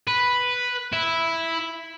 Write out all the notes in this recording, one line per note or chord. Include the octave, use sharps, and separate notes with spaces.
B4
E4